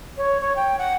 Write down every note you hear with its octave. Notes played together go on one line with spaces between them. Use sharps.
C#5
C#5
G5
F#5